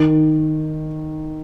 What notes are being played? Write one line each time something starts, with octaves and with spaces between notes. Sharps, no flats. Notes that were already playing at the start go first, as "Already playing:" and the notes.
Already playing: D#3